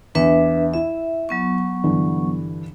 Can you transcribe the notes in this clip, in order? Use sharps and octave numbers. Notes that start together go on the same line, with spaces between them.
E2 D4 B4 E5
E4 E5
F#3 B3 C#6
G2 D3 E3